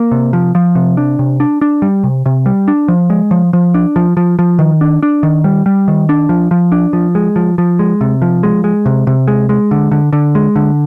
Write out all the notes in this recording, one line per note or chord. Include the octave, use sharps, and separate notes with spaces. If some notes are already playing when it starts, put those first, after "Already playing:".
Already playing: A#3
C3
F3
F3
C3
D4
C3
D4
D4
G3
C3
C3
G3
D4
F3
G#3
F3
F3
D4
F3
F3
F3
D#3
D4
D4
D#3
G3
G3
D#3
D4
F3
F3
D4
F3
G#3
F3
F3
G#3
C3
F3
G#3
G#3
C3
C3
G#3
G#3
D3
D3
D3
G#3
D3